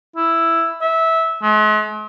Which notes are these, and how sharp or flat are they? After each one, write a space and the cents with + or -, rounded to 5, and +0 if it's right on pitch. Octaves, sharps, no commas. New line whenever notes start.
E4 +5
E5 -15
G#3 +45